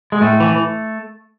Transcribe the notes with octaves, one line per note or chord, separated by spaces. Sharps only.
G#3
A2 A3
E3